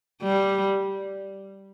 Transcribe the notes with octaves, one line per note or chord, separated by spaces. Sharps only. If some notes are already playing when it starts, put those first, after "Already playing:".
G3